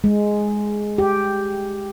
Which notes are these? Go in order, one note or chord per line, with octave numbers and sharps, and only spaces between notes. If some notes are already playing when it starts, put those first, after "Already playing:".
G#3
G4